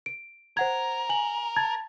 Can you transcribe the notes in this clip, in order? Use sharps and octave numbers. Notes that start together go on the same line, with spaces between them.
D7
A#4 C5 F#5 G#6
G#5 F#7
A5 G#6 A6